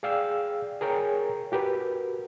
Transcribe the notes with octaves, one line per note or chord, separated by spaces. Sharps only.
G#4 D5 F5 G5 E6
G#4 A#4 C#5 G5 G#5 A#5
F#4 G4 A#4 B4